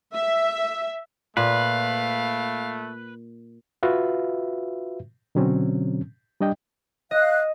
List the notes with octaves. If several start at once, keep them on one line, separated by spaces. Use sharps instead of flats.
E5
A#2 A3 B4 F5
F4 F#4 B4 E5 F5
B2 D3 F#3 C4 C#4
G3 D4 D#5 G5
D#5 F5 F#6